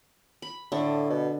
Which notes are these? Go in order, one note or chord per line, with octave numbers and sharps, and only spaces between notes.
B5
A2 D3
B2